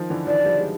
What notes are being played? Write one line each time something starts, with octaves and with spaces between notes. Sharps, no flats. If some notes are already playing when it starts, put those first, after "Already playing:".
Already playing: D#3 F3
D3 E3
D#3 F3 D5
F3 G3
G#3